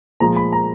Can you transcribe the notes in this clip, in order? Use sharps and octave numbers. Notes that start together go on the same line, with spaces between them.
A#2 F3 G#3 A#5
B5
A#5